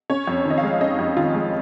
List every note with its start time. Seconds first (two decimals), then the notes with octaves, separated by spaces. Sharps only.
0.10 C#4 C#5
0.27 F2
0.45 D#3
0.50 D#5
0.58 F5
0.64 G#3
0.81 C#4 D#5
0.99 F2
1.17 D#3 F4
1.34 G#3